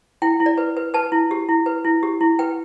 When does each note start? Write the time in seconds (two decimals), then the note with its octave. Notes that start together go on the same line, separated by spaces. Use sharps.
0.22 E4 G5
0.40 E4
0.46 D5
0.58 B4
0.77 B4
0.94 B4 A5
1.12 E4
1.31 G4
1.49 E4
1.66 B4
1.85 E4
2.03 G4
2.21 E4
2.39 B4 G5